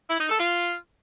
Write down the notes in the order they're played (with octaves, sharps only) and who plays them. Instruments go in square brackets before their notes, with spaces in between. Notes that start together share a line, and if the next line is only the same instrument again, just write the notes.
[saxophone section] E4
D#4
A4
F4